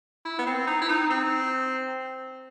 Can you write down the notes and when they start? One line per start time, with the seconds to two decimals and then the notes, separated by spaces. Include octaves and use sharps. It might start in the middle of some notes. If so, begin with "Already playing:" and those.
0.25 E4
0.38 B3
0.46 C4
0.67 D#4
0.82 E4
0.89 D#4
1.10 C4